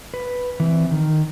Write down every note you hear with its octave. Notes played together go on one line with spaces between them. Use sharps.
B4
E3 C4
D#3